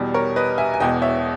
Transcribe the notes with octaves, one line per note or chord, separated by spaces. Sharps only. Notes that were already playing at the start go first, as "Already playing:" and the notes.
Already playing: E2 B2 G3
A#4 C#5
B4 D#5
E5 G#5
G#5
E1 E2 B2 D#5 G5
C#5 E5